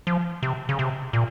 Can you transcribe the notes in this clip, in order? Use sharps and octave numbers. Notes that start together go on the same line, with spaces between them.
F3
C3
C#3
C3
A#2